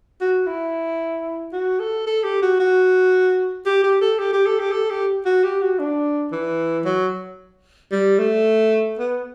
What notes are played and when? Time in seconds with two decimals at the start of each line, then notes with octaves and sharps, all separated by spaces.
0.21 F#4
0.47 E4
1.53 F#4
1.80 A4
2.07 A4
2.24 G4
2.42 F#4
2.60 F#4
3.66 G4
3.84 G4
4.01 A4
4.19 G4
4.33 G4
4.46 A4
4.60 G4
4.72 A4
4.91 G4
5.25 F#4
5.44 G4
5.62 F#4
5.79 D4
6.32 E3
6.85 F#3
7.92 G3
8.19 A3
8.99 B3